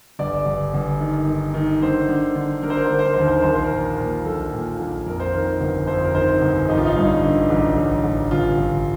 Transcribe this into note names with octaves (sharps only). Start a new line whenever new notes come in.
G1 D5
G1
G1
D#3
D#3
D#3
D3 C5
D3
D3
D3 A#4
C5
A#4
C5
D3 A#4
C5
A#4
C5
D#2 A#4
C5
A#4
A#1 C5
A#4
C5
A#4
A#2
A#2
A#1 A4
A#2
A#1
F2 A#4
C5
D#3 A#4
G1
F2 C5
A#4
D#3 C5
G1
A1 D#4
F4
D#4
G2
D3
A1
A1
A1
G1 F4
G1